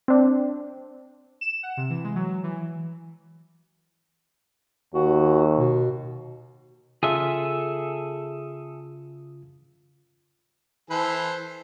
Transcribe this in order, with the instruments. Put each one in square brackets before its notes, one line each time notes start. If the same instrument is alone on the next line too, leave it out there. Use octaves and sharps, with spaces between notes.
[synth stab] C4 D4
[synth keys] E7
F#5
C3
E3
G#3
F#3
E3
[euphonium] D#2 [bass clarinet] F#4
[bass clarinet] B2
[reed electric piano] C#3 F4 [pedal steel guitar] G#4 A4 E5
[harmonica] E3 A4 C5